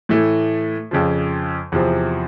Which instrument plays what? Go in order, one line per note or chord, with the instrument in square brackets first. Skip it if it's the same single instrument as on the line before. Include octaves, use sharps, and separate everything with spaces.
[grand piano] A2 E3 A3
F2 C#3 F3
E2 C3 F3